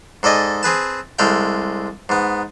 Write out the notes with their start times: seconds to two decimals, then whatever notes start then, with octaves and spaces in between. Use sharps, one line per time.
0.23 G#2 A4 D5 D#5 G#5
0.63 C4 G#4 B4 A5
1.19 C2 G#3 A4 F5 G5
2.09 G#2 B3